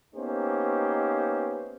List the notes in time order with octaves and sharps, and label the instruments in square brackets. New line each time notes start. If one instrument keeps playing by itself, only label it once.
[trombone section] A#3 B3 C#4 D#4 G4 C5